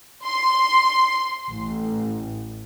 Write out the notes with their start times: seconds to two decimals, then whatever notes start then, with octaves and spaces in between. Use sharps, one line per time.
0.25 C6
1.51 A1